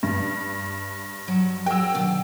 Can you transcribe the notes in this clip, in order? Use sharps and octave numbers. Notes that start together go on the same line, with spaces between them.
G2
F#3
F#3 G#4 A#4 G5 E6
B2 D3 D#3